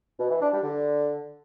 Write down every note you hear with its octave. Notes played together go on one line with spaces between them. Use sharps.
B2
E3
D4
G3
D3